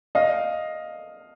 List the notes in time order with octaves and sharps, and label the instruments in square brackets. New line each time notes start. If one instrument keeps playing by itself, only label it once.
[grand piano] D#5 F5